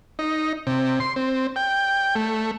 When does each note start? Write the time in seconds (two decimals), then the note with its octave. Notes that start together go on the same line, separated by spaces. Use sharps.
0.19 D#4
0.67 C3
1.00 C6
1.16 C4
1.56 G5
2.16 A3